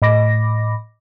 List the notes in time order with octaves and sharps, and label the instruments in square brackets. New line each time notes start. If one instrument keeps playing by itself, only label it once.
[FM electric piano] A2 D#5 B5 D6 A#6